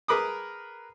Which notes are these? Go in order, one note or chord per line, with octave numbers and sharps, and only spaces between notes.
G#4 A#4 B4 B5 D6 D#6